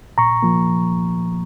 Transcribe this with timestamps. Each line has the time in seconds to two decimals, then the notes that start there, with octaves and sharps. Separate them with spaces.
0.18 A#2 A#5 C#6
0.43 F3 A#3